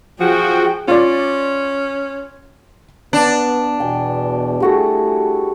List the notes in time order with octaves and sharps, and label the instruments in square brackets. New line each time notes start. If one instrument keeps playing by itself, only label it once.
[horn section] F3 F#4 [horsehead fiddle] G#4 G5
[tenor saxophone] C#4 [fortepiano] F4 D5
[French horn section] B3 [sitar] D4
[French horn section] E2 B2 [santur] G5 G#5
[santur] G3 F#4 A4 [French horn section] A3 E4 G#4